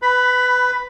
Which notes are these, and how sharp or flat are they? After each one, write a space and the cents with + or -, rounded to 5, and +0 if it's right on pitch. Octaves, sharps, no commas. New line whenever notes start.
B4 +15 B5 +0